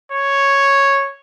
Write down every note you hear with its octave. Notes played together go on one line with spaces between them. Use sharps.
C#5